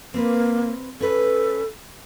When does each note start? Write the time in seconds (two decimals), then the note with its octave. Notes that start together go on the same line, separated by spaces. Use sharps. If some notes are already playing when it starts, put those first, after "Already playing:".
0.14 A#3 C4 B4
1.00 C#4 A4 B4